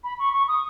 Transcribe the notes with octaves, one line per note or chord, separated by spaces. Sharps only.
B5
C#6
C#6
D#6